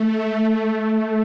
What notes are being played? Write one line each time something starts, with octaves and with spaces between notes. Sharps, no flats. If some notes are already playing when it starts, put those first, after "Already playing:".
Already playing: A3